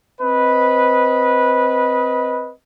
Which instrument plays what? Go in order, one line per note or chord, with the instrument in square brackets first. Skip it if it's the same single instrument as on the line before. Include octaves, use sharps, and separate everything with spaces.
[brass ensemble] C4 B4 D#5